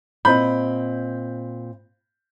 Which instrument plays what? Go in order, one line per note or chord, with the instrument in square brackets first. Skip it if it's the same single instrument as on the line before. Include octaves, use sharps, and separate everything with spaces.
[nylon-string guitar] A#2 C4 D#5 [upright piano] B5 G6